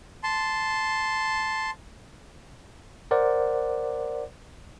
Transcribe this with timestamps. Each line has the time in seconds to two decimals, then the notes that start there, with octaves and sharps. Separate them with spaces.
0.23 A5 C6
3.11 A#4 C5 D5 F#5